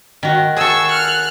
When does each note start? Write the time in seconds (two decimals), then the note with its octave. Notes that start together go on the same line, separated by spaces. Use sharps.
0.23 D#3 F#4
0.56 G#4 A4 C#6 E6
0.92 F6 F#6